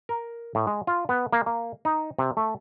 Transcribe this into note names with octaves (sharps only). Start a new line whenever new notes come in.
A#4
A2
G#3
F4
B3
A#3
A#3
D#4
C3
A3